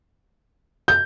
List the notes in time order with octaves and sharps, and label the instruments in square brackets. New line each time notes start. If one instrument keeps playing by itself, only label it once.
[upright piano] G6